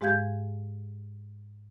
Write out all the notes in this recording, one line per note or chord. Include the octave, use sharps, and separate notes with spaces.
G#2 G#3 G4 F5 G6 G#6